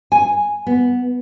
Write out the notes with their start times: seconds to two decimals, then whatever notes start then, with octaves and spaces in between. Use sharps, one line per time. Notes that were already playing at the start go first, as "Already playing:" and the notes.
0.12 G#5
0.67 B3